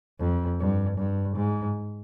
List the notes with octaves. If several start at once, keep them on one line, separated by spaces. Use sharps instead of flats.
F2
G2
G2
G#2